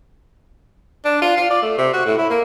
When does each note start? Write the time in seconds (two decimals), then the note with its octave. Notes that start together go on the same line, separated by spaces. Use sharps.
1.05 D4
1.22 F4
1.37 F4
1.51 D5
1.62 A3
1.78 C3
1.93 F#4
2.05 A2
2.18 E4
2.30 A#3